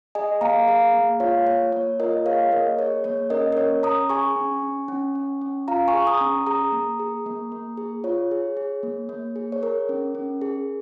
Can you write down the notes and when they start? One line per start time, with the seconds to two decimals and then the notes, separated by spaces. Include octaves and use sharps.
0.15 G#4 D#5 G#5
0.41 A#3 F5 A#5
0.68 G#4 F5 A#5
0.94 A#3
1.20 F4 C#5 F5
1.46 A#3 C#5
1.72 A#3 C#5
2.00 F4 A#4 D#5
2.26 G#4 C#5 F5
2.52 A#3 A#4 D#5
2.79 G#4 C#5
3.04 A#3 C#5
3.30 C#4 A#4 D#5
3.52 A#4
3.57 C#4 C#5
3.83 C#4 A#5 D#6
4.09 G#4 G#5 C#6
4.36 C#4
4.63 C#4
4.88 C#4
5.15 C#4
5.42 C#4
5.68 F4 F5 A#5
5.88 G#5 C#6
5.93 G#4
6.07 A#5 D#6
6.21 C#4
6.46 G#4 A#5 D#6
6.72 A#3
6.99 G#4
7.26 A#3
7.52 A#3
7.77 G#4
8.04 F4 C#5
8.31 G#4
8.57 G#4
8.83 A#3
9.09 A#3
9.36 G#4
9.52 C#5
9.62 G#4 A#4
9.89 C#4
10.15 C#4
10.41 G#4